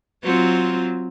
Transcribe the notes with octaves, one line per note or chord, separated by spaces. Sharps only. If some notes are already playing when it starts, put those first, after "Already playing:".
F#3 C4 F4